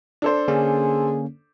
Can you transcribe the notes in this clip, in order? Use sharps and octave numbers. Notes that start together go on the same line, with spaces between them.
D4 A4 C5
D3 A#3 C#4 G#4